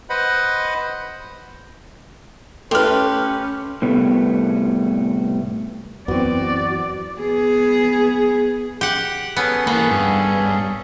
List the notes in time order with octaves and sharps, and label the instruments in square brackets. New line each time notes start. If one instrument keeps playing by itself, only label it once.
[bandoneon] B4 C5 D#5 F#5 B5
[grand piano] A3 [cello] C#4 [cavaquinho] G4 B4 [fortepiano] C6 F6
[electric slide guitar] A2 C3 G3 A3 B3
[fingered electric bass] F#2 E3 [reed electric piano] B3 C4 [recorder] F#4 [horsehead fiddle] D5
[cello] B3 G#4
[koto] G4 F#5
[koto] B3 [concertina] C#4 G#4 A4
[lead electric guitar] E3 A#3 [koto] B3
[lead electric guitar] G2